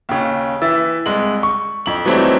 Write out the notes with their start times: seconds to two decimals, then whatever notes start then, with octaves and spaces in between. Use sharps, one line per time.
0.09 D#2 C#3
0.62 E3 E5 E6 A6
1.06 C2 G#3 F#7
1.43 C#6
1.86 F2 F#7
2.05 E3 F#3 G3 A3 C4 D#4